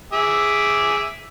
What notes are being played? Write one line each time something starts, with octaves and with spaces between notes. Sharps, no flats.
G#4 E5 D6